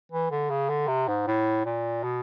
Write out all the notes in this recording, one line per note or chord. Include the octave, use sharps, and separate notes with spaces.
E3
D3
C#3
D3
C3
G#2
A2
A#2
B2